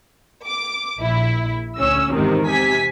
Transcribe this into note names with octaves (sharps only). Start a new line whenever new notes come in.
D6
A#1 E4
D2 C#4 E6
E2 G#2 C3 D#3
C3 G#5 B6